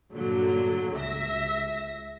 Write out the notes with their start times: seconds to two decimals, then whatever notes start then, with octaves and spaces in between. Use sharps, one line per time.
0.14 G2 A#2 D3 F#3
0.95 C#2 E5 A#6